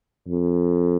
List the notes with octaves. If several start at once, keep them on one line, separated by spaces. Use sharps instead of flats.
F2